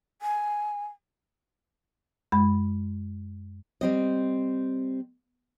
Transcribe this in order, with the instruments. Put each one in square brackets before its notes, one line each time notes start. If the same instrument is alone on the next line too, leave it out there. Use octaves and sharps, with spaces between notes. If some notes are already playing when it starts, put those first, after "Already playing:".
[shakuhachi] G#5
[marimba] F#2 G#3 B5
[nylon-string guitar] G3 C4 D#5